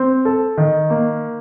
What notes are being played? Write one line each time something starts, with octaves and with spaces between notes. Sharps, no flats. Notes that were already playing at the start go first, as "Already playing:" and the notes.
Already playing: C4
A4
D#3
A#3